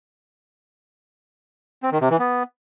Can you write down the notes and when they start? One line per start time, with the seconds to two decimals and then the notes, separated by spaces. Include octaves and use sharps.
1.83 C4
1.92 D#3
2.01 C3
2.10 E3
2.19 B3